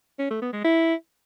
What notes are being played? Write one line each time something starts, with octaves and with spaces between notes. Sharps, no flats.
C#4
A3
B3
G#3
E4